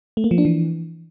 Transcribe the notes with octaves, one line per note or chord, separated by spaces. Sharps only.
A3
A#3
F3
D4
E3